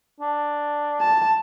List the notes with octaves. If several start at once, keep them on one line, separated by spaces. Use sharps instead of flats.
D4
A5